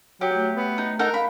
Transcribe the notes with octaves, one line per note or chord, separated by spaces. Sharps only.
F#3 G4 G5
A3
B3
D#4
D#4 A4 A#4 F#5
F5 B5